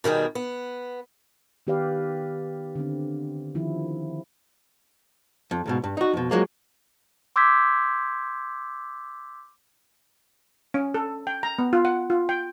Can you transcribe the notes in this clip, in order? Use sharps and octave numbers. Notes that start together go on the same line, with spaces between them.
B2 D#3 G3 G#4
B3
D#3 B3 G4 B4 D5 F5
D3 C4
D#3 F3 E4
F2
C#2 G#2 B2
G2
D#4 F#4
F2 B2
F3 F#3 G#3 A#3
C6 D6 E6 G6 G#6 B6
C#4
A4
G5
A#5
B3
F4
F#5
F4
G5